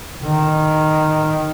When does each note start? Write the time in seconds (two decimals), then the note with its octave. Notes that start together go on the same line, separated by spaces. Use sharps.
0.24 D#3